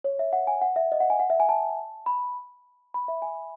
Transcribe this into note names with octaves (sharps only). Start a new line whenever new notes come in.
C#5
E5
F#5
G#5
F#5
E5
D#5
F#5
G#5
F#5
E5
G#5
A5
B5
B5
E5
G#5